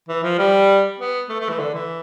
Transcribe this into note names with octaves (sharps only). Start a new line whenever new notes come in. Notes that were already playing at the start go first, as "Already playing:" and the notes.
E3
F3
G3
B3
A3
A3
E3
D3
E3